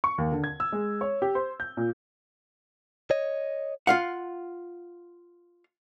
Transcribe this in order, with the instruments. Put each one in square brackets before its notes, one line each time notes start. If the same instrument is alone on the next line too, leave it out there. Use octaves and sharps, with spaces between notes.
[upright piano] C#6
D#2
D3
G#6
E6
G#3
C#5
G4
C5
G6
A#2
[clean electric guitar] C#5 D#5
[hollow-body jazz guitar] F4 F5 F#5